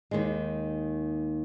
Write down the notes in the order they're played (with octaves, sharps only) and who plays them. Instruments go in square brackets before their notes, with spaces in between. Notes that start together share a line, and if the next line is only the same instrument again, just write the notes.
[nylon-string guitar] D#2 D#3 G#3